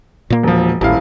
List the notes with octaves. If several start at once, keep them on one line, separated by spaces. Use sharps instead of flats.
A#2 A#3
E1 F3
D#1 A1 E4 F5